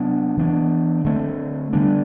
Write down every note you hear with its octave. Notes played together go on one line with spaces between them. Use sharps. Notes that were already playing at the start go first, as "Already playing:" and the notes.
Already playing: C3 F#3 B3 D4
E3 B3 D4
D3 A3 C4
D3 G3 B3 D4